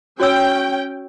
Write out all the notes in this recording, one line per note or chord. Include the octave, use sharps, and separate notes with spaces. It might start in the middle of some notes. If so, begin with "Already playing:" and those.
C#4 F#4 C#5 G5 E6